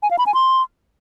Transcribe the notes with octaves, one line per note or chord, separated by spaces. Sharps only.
G#5
F5
B5
G#5
C6